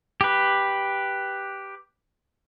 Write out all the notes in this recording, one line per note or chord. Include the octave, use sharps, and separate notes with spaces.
G4 B4